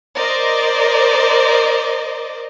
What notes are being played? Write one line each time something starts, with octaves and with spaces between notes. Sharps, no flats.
A#4 C5 D5 D#5